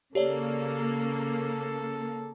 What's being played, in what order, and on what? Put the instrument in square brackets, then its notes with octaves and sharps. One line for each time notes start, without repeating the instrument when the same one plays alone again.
[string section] C#3 A#3 [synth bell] G4 C#5 D5 [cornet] A4